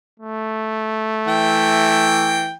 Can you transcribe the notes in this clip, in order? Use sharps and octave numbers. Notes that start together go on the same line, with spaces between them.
A3
E3 G5